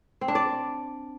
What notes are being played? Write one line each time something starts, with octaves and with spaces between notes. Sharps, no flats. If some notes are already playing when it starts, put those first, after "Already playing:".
C4
D4
D5